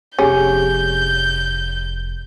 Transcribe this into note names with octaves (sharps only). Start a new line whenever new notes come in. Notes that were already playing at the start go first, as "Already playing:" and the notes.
F1 B3 C#4 G4 G#4 G6